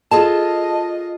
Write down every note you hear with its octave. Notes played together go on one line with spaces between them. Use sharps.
F4 G#4 A4 D#5 A5